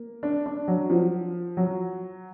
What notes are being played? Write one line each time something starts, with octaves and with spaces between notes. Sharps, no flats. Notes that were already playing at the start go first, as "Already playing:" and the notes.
Already playing: A#3
D4
D4
F#3
F3
F#3